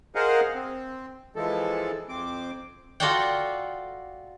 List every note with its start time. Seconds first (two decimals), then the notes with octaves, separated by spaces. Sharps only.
0.15 G#4 A#4 C5 D#5 F5 F#5
0.54 C4
1.36 E3 F3 G#3 A4
2.09 F2 C4 D6
3.00 F4 F#4 A4 D5 F#5 G5